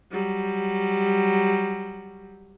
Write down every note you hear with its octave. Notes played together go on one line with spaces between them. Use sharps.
F#3 G3